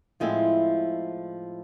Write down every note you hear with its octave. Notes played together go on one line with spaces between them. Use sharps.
A2 F3 G#3 C4 E4